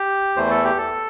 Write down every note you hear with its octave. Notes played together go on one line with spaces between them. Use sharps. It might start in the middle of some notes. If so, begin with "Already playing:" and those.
Already playing: G4
E2 E3 A3 C5
A4
G4
A4